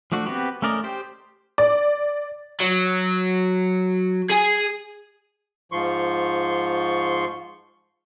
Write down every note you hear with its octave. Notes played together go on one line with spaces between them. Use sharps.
F3 A3 D4 F#4
B3 C4 F#4 G4 B4
A3 C#4 A#4 D5 D#5
G4 C5 G5
D5
F#3
G#4 G#5
G#2 F3 C6 C#6